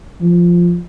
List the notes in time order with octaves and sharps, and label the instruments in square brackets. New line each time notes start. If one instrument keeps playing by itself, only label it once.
[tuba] F3